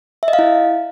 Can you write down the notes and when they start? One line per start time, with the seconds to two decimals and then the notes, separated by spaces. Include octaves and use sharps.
0.23 E5
0.28 D#5
0.33 F5
0.39 E4